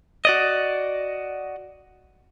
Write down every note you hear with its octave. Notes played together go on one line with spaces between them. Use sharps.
F#4 D5 D#5